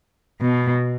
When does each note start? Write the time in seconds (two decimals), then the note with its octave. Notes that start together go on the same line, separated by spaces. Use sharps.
0.41 B2